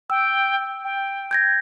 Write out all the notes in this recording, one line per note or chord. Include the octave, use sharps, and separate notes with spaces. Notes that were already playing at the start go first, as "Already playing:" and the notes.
G5 E6
G5
G6 G#6 A#6